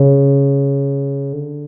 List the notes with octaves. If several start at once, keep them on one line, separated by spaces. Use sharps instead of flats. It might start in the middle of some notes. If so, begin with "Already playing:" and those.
Already playing: C#3
D3